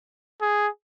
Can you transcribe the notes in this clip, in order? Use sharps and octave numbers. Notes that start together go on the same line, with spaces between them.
G#4